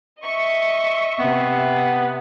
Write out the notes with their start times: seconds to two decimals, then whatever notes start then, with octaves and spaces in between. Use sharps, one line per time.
0.22 D#5 E5 C#6
1.19 C3 B3